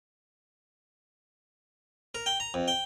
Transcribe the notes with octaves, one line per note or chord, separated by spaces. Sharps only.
A#4
G5
A#5
F2
G5